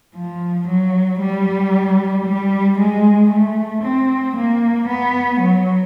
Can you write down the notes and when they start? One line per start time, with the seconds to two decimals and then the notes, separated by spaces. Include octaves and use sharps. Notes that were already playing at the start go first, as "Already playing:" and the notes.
0.15 F3
0.68 F#3
1.20 G3
2.25 G3
2.78 G#3
3.30 A3
3.84 C4
4.37 A#3
4.88 B3
5.41 F#3